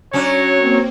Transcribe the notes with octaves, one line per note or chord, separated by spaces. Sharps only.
F#3 C#4 D4 C#5
A#3 C4